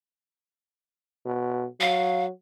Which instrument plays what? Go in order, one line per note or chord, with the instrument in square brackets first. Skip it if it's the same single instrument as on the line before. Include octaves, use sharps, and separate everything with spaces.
[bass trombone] B2
[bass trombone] F#3 [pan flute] F5